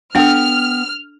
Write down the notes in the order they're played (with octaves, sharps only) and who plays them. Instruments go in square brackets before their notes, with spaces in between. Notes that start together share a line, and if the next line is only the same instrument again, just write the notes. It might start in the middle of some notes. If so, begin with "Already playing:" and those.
[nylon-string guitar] B3 F#5 G5 [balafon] D4 A4 [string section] F6